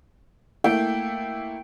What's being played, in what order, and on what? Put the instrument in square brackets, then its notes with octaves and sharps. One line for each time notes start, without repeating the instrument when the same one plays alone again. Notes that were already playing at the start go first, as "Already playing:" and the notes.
[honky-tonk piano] A3 A#3 E4 [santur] G5